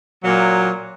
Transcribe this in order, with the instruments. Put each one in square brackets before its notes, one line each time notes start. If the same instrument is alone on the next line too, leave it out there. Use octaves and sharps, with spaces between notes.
[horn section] A#2 F#3 A#3